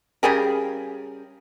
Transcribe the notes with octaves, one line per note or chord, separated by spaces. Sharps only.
C#3 G3 G#4 A#4